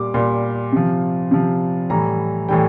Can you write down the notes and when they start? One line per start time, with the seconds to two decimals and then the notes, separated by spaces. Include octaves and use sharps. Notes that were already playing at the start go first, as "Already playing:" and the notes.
Already playing: A#2 G3 D6
0.14 A#2 G3 C6
0.72 C3 F3
1.31 C3 F3
1.90 A2 E3 G3 A#5
2.49 A2 E3 G3 G5